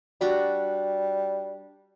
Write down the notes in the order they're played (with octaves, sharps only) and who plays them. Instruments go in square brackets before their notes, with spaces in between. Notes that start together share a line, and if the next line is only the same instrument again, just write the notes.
[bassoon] G3 [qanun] D4 F#4 G4